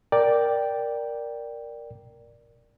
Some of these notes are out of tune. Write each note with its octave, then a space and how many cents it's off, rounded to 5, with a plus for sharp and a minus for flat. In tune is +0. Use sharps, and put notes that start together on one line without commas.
A#4 +0 D5 +0 G5 +0